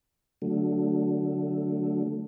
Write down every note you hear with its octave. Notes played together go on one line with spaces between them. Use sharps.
D3 F#3 A3